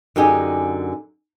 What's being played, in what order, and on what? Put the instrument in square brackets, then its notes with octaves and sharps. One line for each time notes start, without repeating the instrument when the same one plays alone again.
[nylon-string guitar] F#2 D3 D#4 G4 G#4